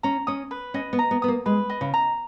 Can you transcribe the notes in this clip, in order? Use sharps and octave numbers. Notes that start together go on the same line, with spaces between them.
C#4 A#5
C#4 D#6
B4
C#4 D#5
B3
A#5
B3
B3 D#6
A#3
G#3 B4
D#5
C#3
A#5